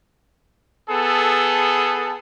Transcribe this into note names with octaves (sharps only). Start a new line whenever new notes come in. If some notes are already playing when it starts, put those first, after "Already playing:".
B3 G#4 A4